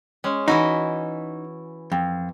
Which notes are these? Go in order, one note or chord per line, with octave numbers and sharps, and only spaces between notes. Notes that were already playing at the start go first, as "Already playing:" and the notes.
G#3 C#4
E3 D#4 E4 F#4
F2